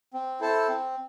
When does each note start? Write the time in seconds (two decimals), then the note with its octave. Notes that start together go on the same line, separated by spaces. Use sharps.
0.14 C4
0.40 E4 A4 C5 A5
0.68 C4